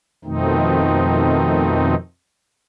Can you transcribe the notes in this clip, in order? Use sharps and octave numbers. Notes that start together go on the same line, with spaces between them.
F2 B2 D#3 A3 C4 D#4